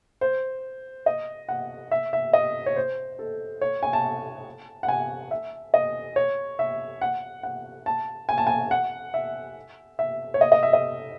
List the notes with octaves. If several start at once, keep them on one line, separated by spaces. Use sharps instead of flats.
C5
D#5
F#5
E5
E5
D#5
C#5
C5
A4
C#5
G#5
A5
F#5
G#5
E5
D#5
C#5
E5
F#5
F#5
A5
G#5
A5
G#5
F#5
E5
E5
C#5
D#5
D#5
E5
D#5